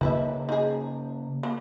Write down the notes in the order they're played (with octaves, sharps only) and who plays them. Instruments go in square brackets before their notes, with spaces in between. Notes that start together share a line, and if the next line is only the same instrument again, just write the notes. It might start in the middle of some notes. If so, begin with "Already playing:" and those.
[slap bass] C#3 A#3 [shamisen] D#4 B4 E5
[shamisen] D#4 G#4
A#3